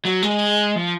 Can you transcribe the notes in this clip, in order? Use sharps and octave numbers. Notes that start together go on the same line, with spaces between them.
F#3
G#3
F3